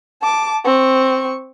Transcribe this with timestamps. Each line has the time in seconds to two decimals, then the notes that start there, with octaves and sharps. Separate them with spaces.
0.22 A5 D6
0.65 C4 C#6